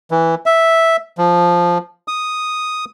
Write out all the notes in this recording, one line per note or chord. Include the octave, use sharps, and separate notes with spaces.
E3
E5
F3
D#6